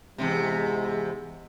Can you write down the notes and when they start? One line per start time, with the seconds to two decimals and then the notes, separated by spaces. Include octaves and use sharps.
0.18 E2 G#2 C3 G#3